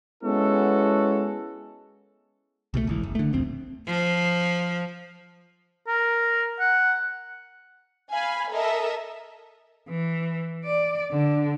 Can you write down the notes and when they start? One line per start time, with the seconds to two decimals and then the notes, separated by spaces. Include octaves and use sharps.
0.24 G#3 B3 C#4 E4 F#4 A4
2.74 C2 B2 F#3 A3
2.87 G#1 C#2 E3
3.03 F#1
3.15 D3 A3
3.32 D#1 A#1 C4
3.87 F3
5.88 A#4
6.60 F#5
8.11 F5 G#5 B5
8.51 A4 A#4 D#5 E5
9.89 E3
10.65 D5
11.11 D3